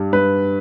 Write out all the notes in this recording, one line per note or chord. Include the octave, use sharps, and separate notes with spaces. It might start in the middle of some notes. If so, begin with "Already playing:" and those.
Already playing: G2 G3
G2 B4